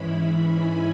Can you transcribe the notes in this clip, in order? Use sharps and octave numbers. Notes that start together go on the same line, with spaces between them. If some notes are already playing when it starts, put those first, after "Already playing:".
Already playing: G#2 E3 G#3 C#4 E4 B5
G#5